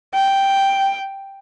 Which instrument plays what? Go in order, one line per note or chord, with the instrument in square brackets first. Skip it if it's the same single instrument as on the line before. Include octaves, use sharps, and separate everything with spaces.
[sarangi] G5